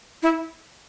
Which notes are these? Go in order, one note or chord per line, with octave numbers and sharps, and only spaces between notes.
E4